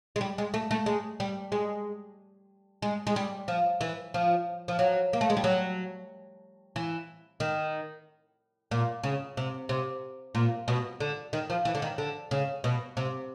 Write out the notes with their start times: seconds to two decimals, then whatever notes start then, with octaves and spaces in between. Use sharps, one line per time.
0.16 G#3
0.21 G3
0.38 G#3
0.54 A3
0.71 A3
0.86 G#3
1.20 G3
1.52 G#3
2.82 G#3
3.07 G#3
3.16 G3
3.48 F3
3.81 E3
4.14 F3
4.68 F3
4.79 F#3
5.13 A#3
5.21 A3
5.30 G#3
5.37 G3
5.44 F#3
6.76 E3
7.40 D#3
8.71 A#2
9.03 C#3
9.37 C3
9.69 C3
10.35 A#2
10.68 B2
11.00 D3
11.33 D#3
11.50 F3
11.65 E3
11.75 D3
11.82 D#3
11.98 D3
12.31 C#3
12.64 B2
12.97 C3